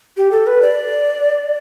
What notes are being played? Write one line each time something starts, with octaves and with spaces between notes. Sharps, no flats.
G4
A4
B4
D5